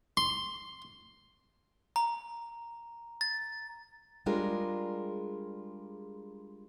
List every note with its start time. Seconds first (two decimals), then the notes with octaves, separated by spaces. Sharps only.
0.17 C6
1.96 A#5
3.21 A6
4.26 G3 G#3 D4 F4 G#4 A#4